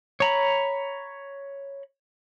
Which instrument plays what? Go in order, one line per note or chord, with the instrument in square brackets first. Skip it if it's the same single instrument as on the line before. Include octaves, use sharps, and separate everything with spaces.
[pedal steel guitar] C#5 A#5 B5